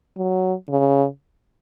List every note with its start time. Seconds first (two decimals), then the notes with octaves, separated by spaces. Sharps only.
0.17 F#3
0.69 C#3